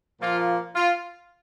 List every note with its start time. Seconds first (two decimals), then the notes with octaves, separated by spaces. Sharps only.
0.21 A#2 F3 A#3 F4
0.75 F4